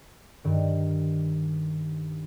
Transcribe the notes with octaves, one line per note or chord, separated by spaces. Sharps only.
G2 D#3